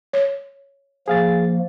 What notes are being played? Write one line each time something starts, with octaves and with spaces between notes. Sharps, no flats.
C#5
F3 A#3 G#4 F5 A6